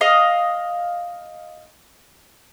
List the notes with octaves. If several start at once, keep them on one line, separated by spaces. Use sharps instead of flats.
D#5 F5